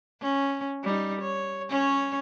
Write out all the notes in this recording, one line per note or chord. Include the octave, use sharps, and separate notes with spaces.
C#4
G3 D#4
C#5
C#4 C#5